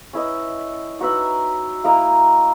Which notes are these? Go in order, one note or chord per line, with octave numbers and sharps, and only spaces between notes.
C#4 E4 B4 D#5
D#4 F#4 B4 E5
A#3 E4 A#4 D#5